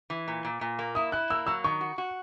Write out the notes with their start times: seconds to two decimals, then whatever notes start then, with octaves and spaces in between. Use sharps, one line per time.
0.10 E3
0.28 A#2
0.45 A#2
0.61 A#2
0.79 A#3
0.95 E4 D#6
1.12 E4 F#6
1.30 A#3 E6
1.47 F#3 E6
1.64 D#3 C#6
1.81 F#4
1.98 F#4